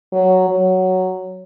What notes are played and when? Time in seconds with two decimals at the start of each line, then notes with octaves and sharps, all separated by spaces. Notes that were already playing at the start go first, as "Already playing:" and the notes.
0.12 F#3
0.49 F#3